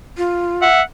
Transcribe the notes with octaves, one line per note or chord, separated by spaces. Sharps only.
F4
E5 F#5